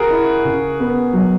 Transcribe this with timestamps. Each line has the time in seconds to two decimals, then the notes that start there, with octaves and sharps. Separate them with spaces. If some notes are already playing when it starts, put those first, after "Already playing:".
Already playing: F#4 G#4 A#4
0.10 E4
0.45 C#3
0.80 B3
1.13 F#3